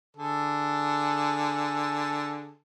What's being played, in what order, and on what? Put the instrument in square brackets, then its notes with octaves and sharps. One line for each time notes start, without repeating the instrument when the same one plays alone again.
[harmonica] D3 G#4 A4